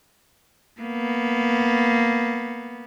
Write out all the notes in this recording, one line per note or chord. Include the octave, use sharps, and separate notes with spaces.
A#3 B3